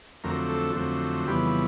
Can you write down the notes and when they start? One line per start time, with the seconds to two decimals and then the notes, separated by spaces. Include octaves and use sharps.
0.24 F2 D3 F#3 A3 C4 A#4
0.49 A4
0.75 F2 D3 F#3 A3 C4
1.27 F2 C#3 E3 G3 B3 G4